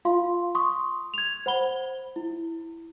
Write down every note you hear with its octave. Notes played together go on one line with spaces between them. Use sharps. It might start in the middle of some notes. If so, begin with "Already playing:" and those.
F4 F5 C6
C6 C#6 D#6
G#6 F7
C5 F#5 B5 G7
E4